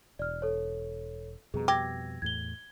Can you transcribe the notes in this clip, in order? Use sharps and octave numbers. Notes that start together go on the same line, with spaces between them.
E1 D5 F6
A4 C#5
F2 B2 G3 G#4 A#5
G4 E6 G#6 A#6
E2 A2 G#6 G7